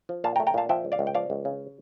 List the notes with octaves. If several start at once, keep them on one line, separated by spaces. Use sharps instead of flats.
F3
A#2 F5 A5
G5 A#5
A3
G5 A#5
A#2 F5 A5
F3 E5 G5
C#2
D5 F5
C#2
G5
F3 D5 F5
C#2
C#3